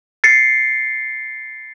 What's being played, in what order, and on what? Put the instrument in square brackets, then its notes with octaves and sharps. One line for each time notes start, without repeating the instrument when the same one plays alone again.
[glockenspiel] A6 C7 C#7